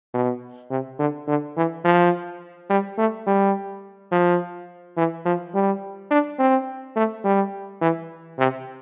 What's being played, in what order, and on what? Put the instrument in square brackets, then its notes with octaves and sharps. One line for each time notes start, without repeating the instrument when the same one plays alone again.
[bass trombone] B2
C3
D3
D3
E3
F3
G3
A3
G3
F3
E3
F3
G3
D4
C4
A3
G3
E3
C3